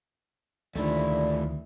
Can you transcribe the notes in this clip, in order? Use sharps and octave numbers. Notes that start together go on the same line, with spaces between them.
D2 A#2 D#3 F3 A3 D4 E4 D5